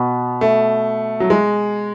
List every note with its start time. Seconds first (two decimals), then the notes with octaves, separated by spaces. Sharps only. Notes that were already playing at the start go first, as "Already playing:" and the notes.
Already playing: B2 B3
0.41 A3
1.20 F#3
1.30 G#3